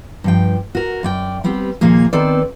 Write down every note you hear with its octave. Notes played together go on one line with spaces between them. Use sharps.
G2 F3 G5
F#4 A#4
F#2 D5 G5
G3 B3 C4 G4
D#2 A#2 F3 A#3 G#4
D#3 B3 C4 A4 B4 D5